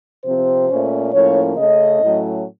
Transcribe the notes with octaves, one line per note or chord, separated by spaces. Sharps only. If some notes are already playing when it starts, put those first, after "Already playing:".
C3 F3 C4 C5
A#2 A3 C#4
A2 F3 A#3 C#4 C#5
C#3 A3 C#4 D#5
A2 F#3 A3 C#4